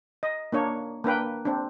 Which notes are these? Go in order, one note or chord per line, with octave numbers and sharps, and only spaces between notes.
D#5
A#3 D4 C#5
A#3 D4 B4 G5
C4 D4